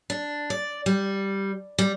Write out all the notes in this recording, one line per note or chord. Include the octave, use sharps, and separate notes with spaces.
D4
D5
G3
G3